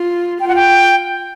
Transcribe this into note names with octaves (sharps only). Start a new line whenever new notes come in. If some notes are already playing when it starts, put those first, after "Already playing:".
Already playing: F4
F4 G5
F#5
G5